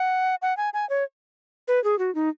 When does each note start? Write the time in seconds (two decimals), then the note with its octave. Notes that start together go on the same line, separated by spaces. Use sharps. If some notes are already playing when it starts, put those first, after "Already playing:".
Already playing: F#5
0.42 F#5
0.57 G#5
0.74 G#5
0.90 C#5
1.68 B4
1.84 G#4
1.99 F#4
2.15 D#4